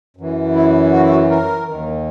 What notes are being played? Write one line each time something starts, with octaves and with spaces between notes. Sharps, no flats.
F#2 E3
E4
F#4
E4
F#4
A#4
D#2 D#3